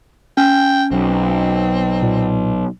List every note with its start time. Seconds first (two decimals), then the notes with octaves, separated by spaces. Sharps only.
0.37 C#4 G5
0.92 B1 C4
2.03 A#2